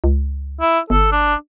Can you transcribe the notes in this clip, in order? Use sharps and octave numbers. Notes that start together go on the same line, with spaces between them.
C#2
E4
G1 A4
D4